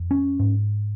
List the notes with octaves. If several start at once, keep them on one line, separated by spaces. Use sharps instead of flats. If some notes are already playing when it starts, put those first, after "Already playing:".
Already playing: F2
C#4
G#2